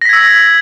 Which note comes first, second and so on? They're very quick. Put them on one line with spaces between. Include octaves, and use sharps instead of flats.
A#6 B6 G#6 E6